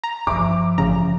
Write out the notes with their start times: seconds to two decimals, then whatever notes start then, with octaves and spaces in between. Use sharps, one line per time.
0.04 A#5
0.27 G2 F3 E5 D6
0.78 A1 C#3 A#5